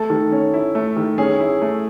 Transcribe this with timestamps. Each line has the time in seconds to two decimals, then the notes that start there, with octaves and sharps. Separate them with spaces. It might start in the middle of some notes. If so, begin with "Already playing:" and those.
Already playing: A3 A4
0.10 D#3
0.32 C#4
0.54 E4
0.75 A3
0.97 D#3
1.18 C#4 G#4
1.40 E4
1.62 A3